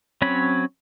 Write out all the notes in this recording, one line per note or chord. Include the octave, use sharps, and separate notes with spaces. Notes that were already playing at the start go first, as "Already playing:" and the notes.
F#3 C4 C#4 C#5 B5